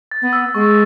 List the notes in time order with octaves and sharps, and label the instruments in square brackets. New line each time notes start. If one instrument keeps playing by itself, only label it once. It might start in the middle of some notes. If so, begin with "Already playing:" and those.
[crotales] A6
[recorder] B3
[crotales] E6
[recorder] G#3 [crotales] C#6